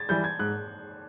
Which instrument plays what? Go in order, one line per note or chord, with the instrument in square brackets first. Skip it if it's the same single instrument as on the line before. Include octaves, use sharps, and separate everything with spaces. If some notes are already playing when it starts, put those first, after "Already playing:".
Already playing: [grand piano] G#6 A6
[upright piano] E3 G3 [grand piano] G6
[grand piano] G#6
[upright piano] G#2 [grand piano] F#6